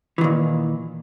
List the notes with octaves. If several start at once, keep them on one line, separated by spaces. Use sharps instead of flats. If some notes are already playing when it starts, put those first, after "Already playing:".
A#2 D#3 E3